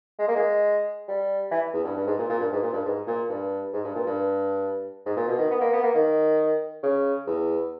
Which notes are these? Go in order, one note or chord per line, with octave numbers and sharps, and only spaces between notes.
G#3
A#3
G#3
G3
E3
E2
G2
G2
G#2
A#2
A#2
G2
G#2
A#2
G2
G#2
A#2
G2
G#2
G2
A#2
G2
G#2
A#2
B2
D#3
B3
A#3
B3
A#3
D#3
C#3
E2